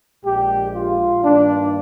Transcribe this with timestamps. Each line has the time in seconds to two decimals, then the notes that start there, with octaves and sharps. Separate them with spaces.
0.24 A#1 A#2 G#3 G4
0.73 F4
1.23 G2 D#3 A#3 D4